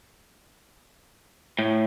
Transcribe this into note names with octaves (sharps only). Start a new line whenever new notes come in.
A2